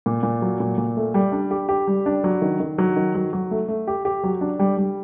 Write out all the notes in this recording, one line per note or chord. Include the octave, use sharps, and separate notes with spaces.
A#2
A#2
F#3
A#2
A#2
A3
G3
D4
G4
G4
G3
D4
F#3
D#3
D#3
F#3
D#3
F#3
F#3
A3
A3
G4
G4
F#3
D4
G3
G3